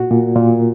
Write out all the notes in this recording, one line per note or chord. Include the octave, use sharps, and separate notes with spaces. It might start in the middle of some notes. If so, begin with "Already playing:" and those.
Already playing: A#2 F#4
A#2
A#2